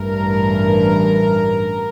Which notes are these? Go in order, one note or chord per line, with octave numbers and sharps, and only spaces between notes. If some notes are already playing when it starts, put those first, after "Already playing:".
Already playing: A1 G2 E3 A#4